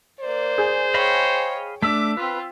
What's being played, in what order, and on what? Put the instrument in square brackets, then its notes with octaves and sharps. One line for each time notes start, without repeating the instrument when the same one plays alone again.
[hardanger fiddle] A#3 D5 [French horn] C5
[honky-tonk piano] G#4 G6
[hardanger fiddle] C#5 G5 [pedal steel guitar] D#5 F5 B5
[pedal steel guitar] A3 D4 [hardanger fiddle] D6 [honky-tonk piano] E6 B6
[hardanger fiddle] C4 F4 [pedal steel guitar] B4